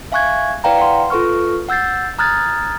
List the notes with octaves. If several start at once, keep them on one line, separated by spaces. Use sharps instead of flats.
E5 F5 G#5 C#6 F#6 G#6
E4 B4 D5 F5 G5 A#5
F#5 C6
F4 A4 B4 C#6 F6
F#5 E6 G6 A6 C7
A#5 D#6 F6 F#6 G#6 A6